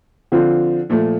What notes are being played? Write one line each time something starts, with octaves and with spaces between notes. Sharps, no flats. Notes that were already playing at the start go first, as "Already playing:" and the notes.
D3 F3 C4 F4
A#2 F3 A3